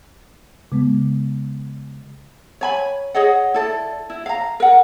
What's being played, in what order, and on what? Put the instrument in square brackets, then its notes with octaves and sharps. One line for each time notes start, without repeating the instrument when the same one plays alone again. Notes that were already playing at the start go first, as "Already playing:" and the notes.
[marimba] C#3 G#3 B3
[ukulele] C#5 G#5 B5
G#4 C#5 D#5 F#5
E4 A4 D5
E4
F5 A#5
A#4 F#5